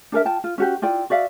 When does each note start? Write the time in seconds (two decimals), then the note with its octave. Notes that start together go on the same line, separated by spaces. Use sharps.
0.12 D4 A4 A#4 E5
0.25 F4 G5 A5
0.44 F4
0.58 C#4 F#4 G4
0.82 E4 F4 D5 G5
1.10 F#4 D5 E5 F5